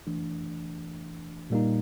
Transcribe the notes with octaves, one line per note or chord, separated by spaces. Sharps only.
E3 A3 D4
A#2 G3 A#3 D#4